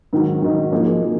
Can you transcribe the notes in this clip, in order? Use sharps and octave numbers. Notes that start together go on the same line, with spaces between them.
G#2 D#3 F#3
G#2 D#3 F#3
F3 A#3 D#4 G#4
F3 A#3 D#4 G#4